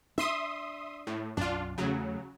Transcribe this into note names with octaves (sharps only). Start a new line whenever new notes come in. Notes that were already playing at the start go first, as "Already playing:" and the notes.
D4 E5 C6 D#6
A2
B1 F#2 D4 F4
E2 C#3 F#3 A3